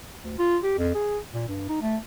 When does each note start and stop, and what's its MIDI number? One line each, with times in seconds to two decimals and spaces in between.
0.23 0.37 38
0.38 0.58 65
0.63 0.78 67
0.78 0.90 41
0.95 1.18 68
1.34 1.45 46
1.49 1.69 43
1.69 1.79 63
1.82 1.97 57